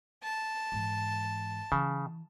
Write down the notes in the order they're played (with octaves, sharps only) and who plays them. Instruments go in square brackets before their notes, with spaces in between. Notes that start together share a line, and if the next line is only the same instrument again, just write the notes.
[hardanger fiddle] A5
[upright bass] G#2 E3
[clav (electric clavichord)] C#3 [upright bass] E3